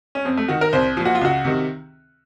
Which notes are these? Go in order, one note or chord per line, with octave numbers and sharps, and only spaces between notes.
C#4
F2 C4
A3
D#3 F#4
A#4
C2 C5
A#2 F3
F#4
F4
C#2 F#4
C3 D#3